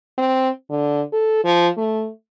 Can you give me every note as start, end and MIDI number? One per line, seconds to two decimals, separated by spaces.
0.18 0.50 60
0.70 1.02 50
1.13 1.42 69
1.44 1.68 53
1.77 2.09 57